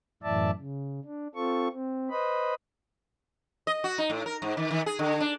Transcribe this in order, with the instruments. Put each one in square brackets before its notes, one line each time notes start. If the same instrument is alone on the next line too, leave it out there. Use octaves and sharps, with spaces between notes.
[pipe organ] F#2 A2 E3 D5 E5 A5
C#3
D4
C4 F4 A4 C#6
C4
B4 C5 D#5 B5
[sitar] D#5
F#4
D#4
A2
A#4
G#2
D#3
D#3
G#4
D3
D4